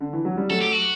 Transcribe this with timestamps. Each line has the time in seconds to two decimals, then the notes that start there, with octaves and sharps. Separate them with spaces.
0.01 D3
0.13 E3
0.25 F#3
0.37 G3
0.49 F#3 A3 A4
0.61 G4
0.73 F#4